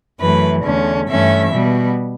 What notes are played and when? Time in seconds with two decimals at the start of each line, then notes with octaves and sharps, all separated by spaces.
0.20 F#2 E3 A3 B4
0.64 E2 D3 A3 C#4
1.08 G2 E3 A3 C#4 E5
1.52 B2 G3 B3